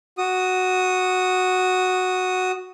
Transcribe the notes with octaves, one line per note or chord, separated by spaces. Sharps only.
F#4 D#6